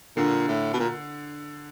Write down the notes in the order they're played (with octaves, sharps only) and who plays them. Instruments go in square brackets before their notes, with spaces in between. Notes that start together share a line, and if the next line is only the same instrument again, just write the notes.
[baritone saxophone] A#2 [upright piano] D3
[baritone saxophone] A2
B2
A#2